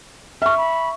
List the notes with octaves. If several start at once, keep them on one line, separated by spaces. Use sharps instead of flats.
E5 C#6 F6
B5